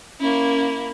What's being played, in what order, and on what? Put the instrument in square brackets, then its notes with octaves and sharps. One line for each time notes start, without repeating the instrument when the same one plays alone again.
[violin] A#3 E4 [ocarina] C#4